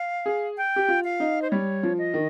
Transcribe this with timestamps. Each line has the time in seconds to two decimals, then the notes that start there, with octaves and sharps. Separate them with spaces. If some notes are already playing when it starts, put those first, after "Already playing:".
Already playing: F5
0.26 G#4
0.57 G5
0.76 G4
0.88 F4
1.04 F5
1.20 D#4
1.42 C5
1.51 G3 C#5
1.83 F3
1.98 D#5
2.14 D#3